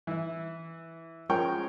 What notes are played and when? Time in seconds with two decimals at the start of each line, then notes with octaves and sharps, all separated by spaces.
0.07 E3 E4
1.29 F3 G#3 C#4 A#4 G5 C#6